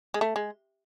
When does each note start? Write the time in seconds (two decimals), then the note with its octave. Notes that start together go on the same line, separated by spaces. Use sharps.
0.14 G#3
0.21 A3
0.36 G#3